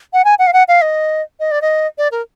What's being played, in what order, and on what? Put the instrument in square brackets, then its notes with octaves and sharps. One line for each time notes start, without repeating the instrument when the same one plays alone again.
[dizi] F#5
G#5
F#5
F5
F#5
F5
D#5
D#5
D5
D#5
D5
A#4